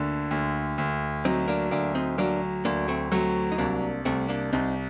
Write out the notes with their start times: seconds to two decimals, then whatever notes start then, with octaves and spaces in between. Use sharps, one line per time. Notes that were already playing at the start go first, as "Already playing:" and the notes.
Already playing: D2 D3 A#3 D4
0.31 D2
0.78 D2
1.25 F#3 C4 D#4
1.48 A#3 D4
1.71 D2 A#3 D4
1.95 C4 D#4
2.18 F#3 A#3 D4
2.65 D2 A#3 D4
2.88 A3 C4
3.12 F#3 A3 C4
3.52 D#4
3.58 C2 A#3 D4
4.05 C2 A3 C4
4.29 A#3 D4
4.53 C2 C4 D#4